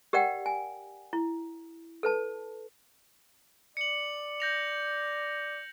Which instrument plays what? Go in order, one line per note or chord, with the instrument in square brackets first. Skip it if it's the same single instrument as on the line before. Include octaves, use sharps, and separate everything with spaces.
[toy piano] G4 A#4 D5 F#5 G5
G#5
E4
A4 B4 A5
[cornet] D5 [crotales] C#7 F#7
[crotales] G6 A#6 F7